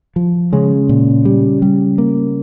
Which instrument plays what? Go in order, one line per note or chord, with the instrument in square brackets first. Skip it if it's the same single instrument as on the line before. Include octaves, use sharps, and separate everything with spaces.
[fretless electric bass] F3
[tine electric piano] C#3 C#4 [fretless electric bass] G#3
[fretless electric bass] A#2
G3
G3
A#3